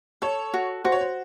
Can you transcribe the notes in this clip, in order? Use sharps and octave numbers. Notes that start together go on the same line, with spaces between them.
A4 C#5
F#4
F#4 C5
C#5
C5